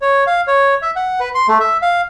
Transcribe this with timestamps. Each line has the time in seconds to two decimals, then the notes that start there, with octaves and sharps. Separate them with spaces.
0.01 C#5
0.27 F5
0.47 C#5
0.82 E5
0.96 F#5
1.20 B4
1.35 C6
1.48 A3
1.60 E5
1.82 F5